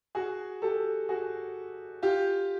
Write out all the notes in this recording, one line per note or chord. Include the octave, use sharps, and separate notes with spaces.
F#4 G#4
G4 A4
F#4 G#4
F4 G4